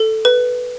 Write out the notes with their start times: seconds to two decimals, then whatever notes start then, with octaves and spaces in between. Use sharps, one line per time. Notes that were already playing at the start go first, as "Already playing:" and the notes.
Already playing: A4
0.25 B4